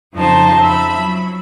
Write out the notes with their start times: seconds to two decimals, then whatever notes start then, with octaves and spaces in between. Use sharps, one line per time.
0.14 F2 C#3 F3 D#4 C5 A5
0.60 E5 B5
0.95 F#3